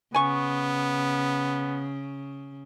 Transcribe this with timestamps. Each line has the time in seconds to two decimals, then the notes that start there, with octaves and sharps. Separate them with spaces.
0.14 C#3 B3 G#5 C#6